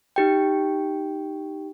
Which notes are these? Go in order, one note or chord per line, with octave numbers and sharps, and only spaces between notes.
D#4 G4 G5